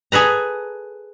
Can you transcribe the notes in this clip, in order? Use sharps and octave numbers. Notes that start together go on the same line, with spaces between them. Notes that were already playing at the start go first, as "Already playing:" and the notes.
G#4 A4 B4 A#5